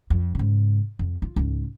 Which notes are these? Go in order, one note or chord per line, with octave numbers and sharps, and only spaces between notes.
F2
G#2 C#3
F2
F4
C#2 G#2